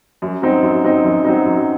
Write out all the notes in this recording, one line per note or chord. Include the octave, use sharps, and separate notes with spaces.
F#2
F#3 C4 D#4
F#2
F#3 C4 D#4
F#2
F#3 C4 D#4
F#2